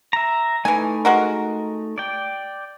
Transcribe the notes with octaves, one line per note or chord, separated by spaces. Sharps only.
E5 A#5
E3 A3 D#4 G#5
G#3 F#4 A#4
D5 G5